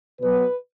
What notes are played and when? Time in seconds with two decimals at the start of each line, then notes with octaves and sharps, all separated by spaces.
0.21 B2 F#3 B4